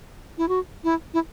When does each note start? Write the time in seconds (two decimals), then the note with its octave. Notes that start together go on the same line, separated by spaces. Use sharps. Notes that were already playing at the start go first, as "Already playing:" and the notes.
0.38 E4
0.49 F#4
0.84 E4
1.14 E4